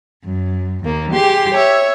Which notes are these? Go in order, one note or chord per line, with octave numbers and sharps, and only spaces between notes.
F#2
D#2 A#3
G4 G#4 C6
C#5 E5